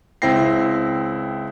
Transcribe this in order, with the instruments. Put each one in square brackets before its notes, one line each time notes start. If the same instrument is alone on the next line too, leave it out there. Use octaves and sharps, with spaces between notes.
[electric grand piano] C#2 C4 E4 G5 A#6 C7